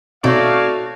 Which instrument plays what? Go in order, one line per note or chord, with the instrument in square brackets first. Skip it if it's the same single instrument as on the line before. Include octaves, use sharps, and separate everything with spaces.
[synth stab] B2 C4 D#4 [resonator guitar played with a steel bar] A3 [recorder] F#4 [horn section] C#5 D5 F5